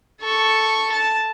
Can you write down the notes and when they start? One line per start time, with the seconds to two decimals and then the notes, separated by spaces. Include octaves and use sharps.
0.22 A4 C#6
0.92 A5